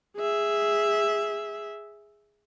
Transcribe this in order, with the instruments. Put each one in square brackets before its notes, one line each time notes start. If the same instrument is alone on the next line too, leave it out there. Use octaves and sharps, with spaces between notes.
[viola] G#4 E5